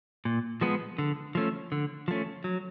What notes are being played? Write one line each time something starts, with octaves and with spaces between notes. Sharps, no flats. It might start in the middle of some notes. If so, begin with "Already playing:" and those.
A#2
F3 G#3 B3
D3
F3 A3 C#4
D3
F3 A3 C#4
F#3